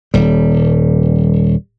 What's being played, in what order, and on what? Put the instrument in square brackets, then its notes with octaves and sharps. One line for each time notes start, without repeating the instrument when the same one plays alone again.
[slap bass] D#1 G3